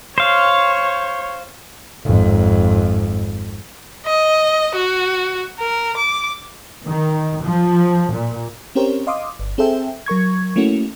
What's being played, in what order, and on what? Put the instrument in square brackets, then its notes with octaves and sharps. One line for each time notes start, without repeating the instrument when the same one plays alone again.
[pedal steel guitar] C5 F5 [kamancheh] C#5
[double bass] G#1 F2
[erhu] D#5
F#4
A#4
D6
[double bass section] D#3
F3
A#2
[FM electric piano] C4 C#4 G4 A#4 C5 C#5
D#5 F5 C6 D6 D#6
G1
C4 G#4 A4 C5 E5 G5
F#3 A#4 C#6 G#6
A3 A#3 C#4 E4 F#4